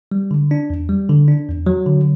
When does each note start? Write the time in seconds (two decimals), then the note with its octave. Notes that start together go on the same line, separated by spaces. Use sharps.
0.12 G3
0.31 D3
0.51 D4
0.70 E2
0.89 G3
1.09 D3
1.28 D4
1.48 E2
1.66 F#3
1.86 D3